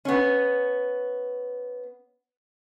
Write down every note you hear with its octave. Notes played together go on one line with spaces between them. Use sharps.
B3 C#4